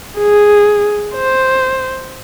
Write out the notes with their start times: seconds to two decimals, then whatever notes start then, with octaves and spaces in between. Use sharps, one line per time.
0.18 G#4
1.15 C5